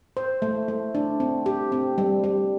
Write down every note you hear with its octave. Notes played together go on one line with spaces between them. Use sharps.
C5
A3
A3
D4
C4
G4
C4
G3
G3